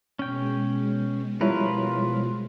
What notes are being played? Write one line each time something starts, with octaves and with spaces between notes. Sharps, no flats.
B2 G#3 C#4 G5
F3 G3 E4 F4 A#4 B4 C#5